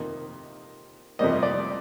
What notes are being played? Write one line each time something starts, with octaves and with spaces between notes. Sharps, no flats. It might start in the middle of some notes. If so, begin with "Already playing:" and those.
Already playing: F2 C3 D#3 A#3
F2 C3 G3 A#3 D#5
D5